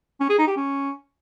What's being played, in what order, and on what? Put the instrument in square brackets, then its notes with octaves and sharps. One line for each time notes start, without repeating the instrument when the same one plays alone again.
[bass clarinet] C#4
G#4
D#4
G4
C#4